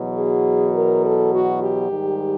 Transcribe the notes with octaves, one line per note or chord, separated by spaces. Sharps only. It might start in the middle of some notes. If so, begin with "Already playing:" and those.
Already playing: E2 B2 F#3
G#4
A#4
A4
F#4
G4
G#2 D#3 G3